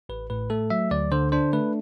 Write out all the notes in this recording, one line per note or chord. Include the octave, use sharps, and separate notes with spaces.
A1 B4
A2 B4
A3 A4
F#3 E5
D2 D5
D3 C5
D4 C5
A3 B4